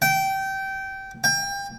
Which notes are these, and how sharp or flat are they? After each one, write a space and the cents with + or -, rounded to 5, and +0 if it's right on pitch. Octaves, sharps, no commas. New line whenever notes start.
G5 -20
G5 +30